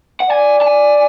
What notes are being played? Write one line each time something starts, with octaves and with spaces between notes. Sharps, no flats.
F#5
D5 G#5
A5
G#5